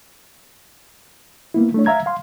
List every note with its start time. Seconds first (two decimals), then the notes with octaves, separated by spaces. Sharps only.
1.54 A#3 B3 E4
1.74 A3 D4 C#5
1.86 E5 F5 A#5 G#6
2.06 F5 C6